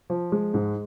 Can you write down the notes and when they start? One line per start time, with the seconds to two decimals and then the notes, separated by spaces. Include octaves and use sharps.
0.10 F3
0.32 G#3
0.54 G#2